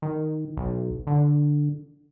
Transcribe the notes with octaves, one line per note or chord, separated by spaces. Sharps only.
D#3
B1
D3